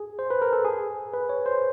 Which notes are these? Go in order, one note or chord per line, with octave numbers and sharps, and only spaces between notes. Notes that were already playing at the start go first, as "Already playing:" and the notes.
Already playing: G#4
C5
B4
A#4
A4
G#4
B4
C#5
C5